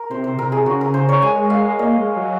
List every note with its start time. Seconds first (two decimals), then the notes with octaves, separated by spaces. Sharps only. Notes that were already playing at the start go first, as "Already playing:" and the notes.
Already playing: A#4
0.10 C3 C5
0.24 C5
0.38 C3 A#4
0.52 G#4
0.66 C#3 F#4
0.81 A#4
0.94 C5
1.09 C#5
1.22 G#3 G#5
1.50 F5
1.78 A#3 D#5
1.97 G#3
2.17 F#3